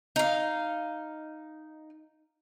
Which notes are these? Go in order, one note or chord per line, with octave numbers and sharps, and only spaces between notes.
D#4 F5